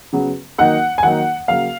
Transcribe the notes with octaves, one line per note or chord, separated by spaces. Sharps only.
C#3 F#3 B3
D#3 F#3 A#3 D#4 F#5
G#5
D#3 F#3 A#3 D#4 F#5
C#3 F#3 A#3 F5